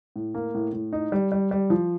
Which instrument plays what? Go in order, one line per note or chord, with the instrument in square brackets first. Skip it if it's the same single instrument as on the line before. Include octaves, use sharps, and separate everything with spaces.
[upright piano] A2
A#3
A2
A2
D#4
G3
G3
G3
F3